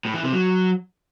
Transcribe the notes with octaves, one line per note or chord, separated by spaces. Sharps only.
A2
E3
C3
F#3